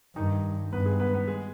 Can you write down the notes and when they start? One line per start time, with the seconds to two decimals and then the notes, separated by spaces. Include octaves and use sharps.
0.16 G2 D#3 D#4
0.72 G2 B3 B4
0.86 G#3 G#4
1.00 B3 B4
1.14 B3 B4
1.28 G#3 G#4